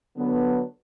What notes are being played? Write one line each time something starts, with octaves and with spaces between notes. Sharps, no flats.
D3 F#3 B3 D4